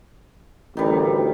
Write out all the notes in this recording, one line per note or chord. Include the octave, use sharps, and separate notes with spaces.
A1 D2 D#3 G3